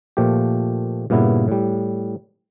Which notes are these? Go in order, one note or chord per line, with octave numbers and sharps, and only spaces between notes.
A#2 F3 A3 G4
G2 A#2 C#3 B3 E4
A2 G3